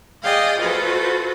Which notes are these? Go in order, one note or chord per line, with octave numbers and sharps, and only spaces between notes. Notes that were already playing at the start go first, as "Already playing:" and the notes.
G#4 D5 D#5 F5 G5
F4 F#4 A4 B4 C5